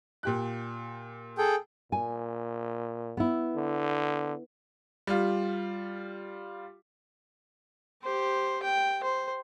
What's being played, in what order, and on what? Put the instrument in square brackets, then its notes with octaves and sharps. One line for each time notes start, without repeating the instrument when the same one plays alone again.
[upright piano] A#2 G4 F#6
[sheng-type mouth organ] G#4 A4 G5
[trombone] A#2 [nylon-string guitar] G#5
[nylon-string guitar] B3 E4
[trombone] D3
[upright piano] G3 F4
[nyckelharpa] G4 C5
G5
C5